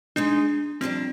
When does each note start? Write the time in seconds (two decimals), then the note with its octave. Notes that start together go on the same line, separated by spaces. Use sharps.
0.16 G#3 D4 D#4 G#4 D#5
0.81 F2 C3 G3 C4 D4